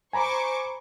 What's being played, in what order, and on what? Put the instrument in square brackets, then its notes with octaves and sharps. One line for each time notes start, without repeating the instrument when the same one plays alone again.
[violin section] C5 C#6 D6 [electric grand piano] G#5 A#5 B5